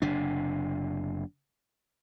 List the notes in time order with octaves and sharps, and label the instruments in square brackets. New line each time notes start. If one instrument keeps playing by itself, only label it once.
[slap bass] F#1 C3 D4